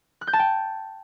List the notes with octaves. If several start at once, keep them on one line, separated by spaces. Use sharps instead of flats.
F#6
G6
A5
G5